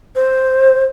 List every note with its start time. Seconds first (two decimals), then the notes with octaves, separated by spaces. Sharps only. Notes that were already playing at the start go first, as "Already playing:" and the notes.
0.16 C5